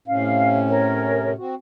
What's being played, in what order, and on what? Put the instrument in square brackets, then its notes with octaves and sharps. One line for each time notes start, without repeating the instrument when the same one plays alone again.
[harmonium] A2 C3 C#4 [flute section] F5
[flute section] A#4 C#5
[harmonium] C4 F#4